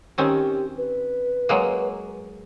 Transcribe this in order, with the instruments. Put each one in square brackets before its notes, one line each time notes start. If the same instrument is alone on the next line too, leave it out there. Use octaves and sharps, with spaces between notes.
[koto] D#3 C4 C#4 [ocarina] G4
[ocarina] B4
[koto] F#3 G#3 A#3